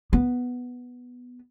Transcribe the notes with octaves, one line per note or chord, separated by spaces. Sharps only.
B3